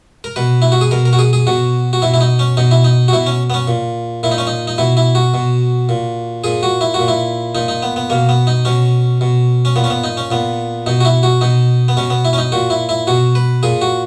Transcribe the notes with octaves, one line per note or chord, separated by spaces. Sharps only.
A#4
B2 B4
E4
F#4
G#4
B2 A#4
A#4
F#4
G#4
G#4
B2 F#4
F#4
B2 E4
E4
D#4
C#4
B2 D#4
E4
D#4
F#4
B2 E4
C#4
B3
C#4
A#2
A#2 E4
D#4
C#4
D#4
D#4
B2 E4
E4
F#4
B2
A#2
A#2 G#4
F#4
E4
F#4
A#2
E4
A#2 D#4
D#4
B3
B3
B2 A#3
B3
D#4
B2 C#4
B2
C#4
A#2 B3
C#4
B3
D#4
C#4
A#2 B3
B2 D#4
F#4
E4
F#4
B2 D#4
B3
B2 C#4
B3
E4
C#4
D#4
A#2 F#4
E4
E4
B2 F#4
B4
A#2 G#4
F#4